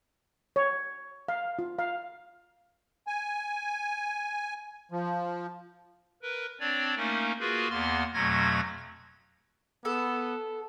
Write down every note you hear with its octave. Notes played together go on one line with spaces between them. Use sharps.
C#5
F5
F4
F5
G#5
F3
A#4 B4
C4 D4 C#5 D5
A3 A#3 C#4 D#4 A#4
A#3 F4 F#4 G#4 A#4 B4
E2 A#3 B3 C6 F6
F2 B2 F#3 A3 G#6 A#6
B3 A4